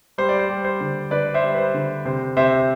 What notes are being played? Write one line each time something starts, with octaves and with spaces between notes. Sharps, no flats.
G3 C5
D5
C5
G3
C5
D3
D3 B4 D5
C5 E5
G3
B4
C5
D3
C3 C5
C3 C5 E5